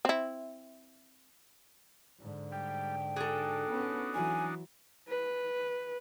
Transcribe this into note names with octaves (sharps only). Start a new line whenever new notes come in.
C4 E4
G#2 D3
G3 G5
D4 D#4 F#4 G#4 A4
B3 C#4
E3 F#3 G#5
B4